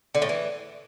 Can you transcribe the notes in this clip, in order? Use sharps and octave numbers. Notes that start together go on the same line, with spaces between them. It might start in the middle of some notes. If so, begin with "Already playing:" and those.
D3
A2
E3